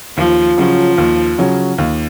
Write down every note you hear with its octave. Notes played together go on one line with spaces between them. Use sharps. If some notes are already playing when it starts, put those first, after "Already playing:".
D#2 F3
C#3 F3 F#3 C#4
D#2
C#3 F#3 C#4
D#2